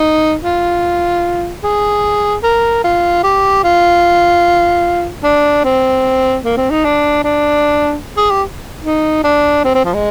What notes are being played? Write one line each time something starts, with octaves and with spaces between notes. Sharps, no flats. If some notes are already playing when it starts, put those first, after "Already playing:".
Already playing: D#4
F4
G#4
A#4
F4
G4
F4
D4
C4
A#3
C4
D#4
D4
D4
G#4
G4
D#4
D4
C4
C4
F3
G#3